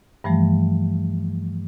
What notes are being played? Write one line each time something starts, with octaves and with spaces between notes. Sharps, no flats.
G2 E3 F3 G3 A3